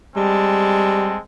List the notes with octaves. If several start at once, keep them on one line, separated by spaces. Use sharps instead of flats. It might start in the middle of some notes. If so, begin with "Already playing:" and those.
G3 G#3 C4 A5